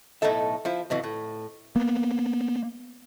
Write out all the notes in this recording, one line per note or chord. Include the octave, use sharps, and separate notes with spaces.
B1 A2 A3 D#4 A4 E5
F3 E4
F2 B2 E3 F#3
A2
A#3 B3